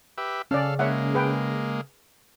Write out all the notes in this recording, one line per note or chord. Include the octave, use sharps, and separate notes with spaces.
G4 B4 E5
C#3 C#4 A4 D5 F5
G#3 A#3 C#5 E5 F#5
G#4 B4 G5